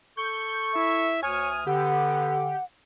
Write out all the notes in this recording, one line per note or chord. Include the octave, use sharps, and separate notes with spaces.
A4 C#6 G6
E4 E5
D2 C#5 G#5 D#6 F6
D3 B3 G4 F#5